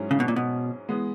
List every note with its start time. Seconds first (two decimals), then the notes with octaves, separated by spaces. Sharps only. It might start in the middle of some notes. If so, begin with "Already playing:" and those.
Already playing: G#2 F#3 C#4 E4 G#4
0.11 C#3
0.20 B2
0.28 A#2
0.36 B2
0.89 E3 G#3 B3